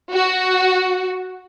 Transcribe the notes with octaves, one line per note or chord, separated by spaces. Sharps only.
F#4